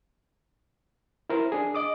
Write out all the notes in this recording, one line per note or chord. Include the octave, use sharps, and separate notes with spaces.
E4 A#4 C5
D4 G#4
D#5 D6 D#6